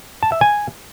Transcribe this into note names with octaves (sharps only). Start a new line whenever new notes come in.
A5
E5
G#5